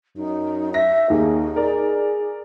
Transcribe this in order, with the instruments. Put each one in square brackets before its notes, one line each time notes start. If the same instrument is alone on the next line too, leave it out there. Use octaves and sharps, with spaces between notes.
[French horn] F#2 [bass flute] D#4
[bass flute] E5 [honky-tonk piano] A#6
[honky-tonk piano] D#2 A#3 G4 [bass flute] D#4 [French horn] G#4
[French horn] G#4 [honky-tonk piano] A#4 D5